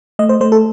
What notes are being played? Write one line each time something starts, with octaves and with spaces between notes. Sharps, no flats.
A3 D#5
C5
A3 C5
A4